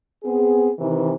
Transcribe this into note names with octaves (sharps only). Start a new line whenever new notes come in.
B3 C4 G#4
C3 D#3 E3